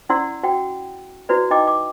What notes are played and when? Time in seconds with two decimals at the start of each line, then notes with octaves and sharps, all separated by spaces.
0.09 C#4 E4 D5 F#5 C6 E6
0.43 F#4 F#5 G5
1.29 E4 F#4 B4 D5
1.51 D#4 D#5 G5 D6
1.67 D6